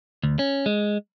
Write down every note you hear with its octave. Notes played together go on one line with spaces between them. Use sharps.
D2
C#4
G#3